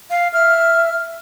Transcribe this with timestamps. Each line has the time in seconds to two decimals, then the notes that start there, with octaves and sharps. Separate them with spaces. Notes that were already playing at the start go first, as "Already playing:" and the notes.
0.10 F5
0.33 E5 F6